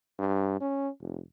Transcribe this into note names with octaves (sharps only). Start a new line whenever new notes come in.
G2
C#4
F1